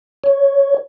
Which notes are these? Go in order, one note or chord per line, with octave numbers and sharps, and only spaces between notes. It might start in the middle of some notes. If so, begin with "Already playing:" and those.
C#5